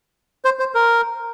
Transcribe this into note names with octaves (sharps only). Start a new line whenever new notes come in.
C5
C5
A#4